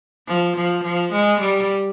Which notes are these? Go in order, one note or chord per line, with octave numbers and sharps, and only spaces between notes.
F3
F3
F3
G#3
G3